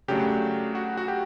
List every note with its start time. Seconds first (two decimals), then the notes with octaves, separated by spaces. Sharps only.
0.08 C#3 F#3 A3 D4 G4
0.75 F#4
0.97 F#4
1.08 G4